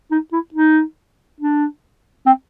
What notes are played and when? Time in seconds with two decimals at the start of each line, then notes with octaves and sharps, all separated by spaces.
0.11 D#4
0.32 E4
0.54 D#4
1.40 D4
2.26 C4